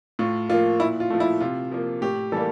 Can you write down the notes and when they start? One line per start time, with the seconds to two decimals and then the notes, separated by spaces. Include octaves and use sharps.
0.19 A2 F4
0.49 F3 A#3 F4
0.80 A#2 E4
1.00 F4
1.10 F3 A3
1.20 E4
1.40 C3 F4
1.71 F3 A#3
2.02 A2 G4
2.32 E3 G3 A#3 A4